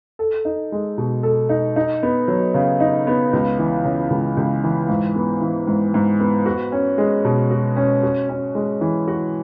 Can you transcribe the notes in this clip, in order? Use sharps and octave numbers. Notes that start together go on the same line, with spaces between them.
A4
D#4
G#3
B2
A4
D#4
D#4
B3
F#3
C#3
D#4
B3
C#2
E3
C#3
C#2
C#2
E3
G#2
B3
E3
G#2
G#2
B3
F#4
C#4
G#3
B2
F#4
C#4
F#4
C#4
G#3
E3
F#4